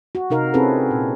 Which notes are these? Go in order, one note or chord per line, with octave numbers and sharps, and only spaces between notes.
F#4
C3 D#4 A#4 F5
C4 C#4 E4 G#4 A4 B4
A#2